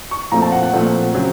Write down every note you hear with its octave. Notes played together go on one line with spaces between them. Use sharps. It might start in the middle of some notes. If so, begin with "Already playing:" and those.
C#6
A#2 F3 A3 C4 A#5
A5
F#5
F#5
A#2 F3 A3 C4
C#3 F#3 C4